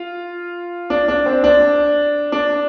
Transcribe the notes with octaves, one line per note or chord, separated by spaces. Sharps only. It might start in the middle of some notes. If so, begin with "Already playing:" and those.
Already playing: F4
D4
D4
C4
D4
D4